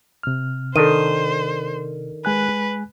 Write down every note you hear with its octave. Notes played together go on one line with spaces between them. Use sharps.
C3 F6
D#3 D4 A4 C5 D#7
G#3 B4 G#5 F#6